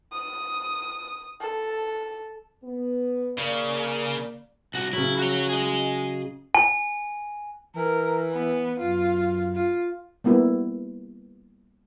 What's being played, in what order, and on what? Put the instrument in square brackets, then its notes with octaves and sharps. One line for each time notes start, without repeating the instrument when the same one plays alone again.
[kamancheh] D#6
A4
[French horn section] B3
[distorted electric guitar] C#3 [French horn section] A#3 D5
[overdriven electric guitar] C2 F#4
[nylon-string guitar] C#3 F#3 [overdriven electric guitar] E4
[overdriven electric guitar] F#4 C#5
G#4 D#5
[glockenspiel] G#5
[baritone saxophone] E3 [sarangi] A#4
[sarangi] B3
[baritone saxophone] F#2 [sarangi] F4
[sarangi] F4
[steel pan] G3 A#3 B3 E4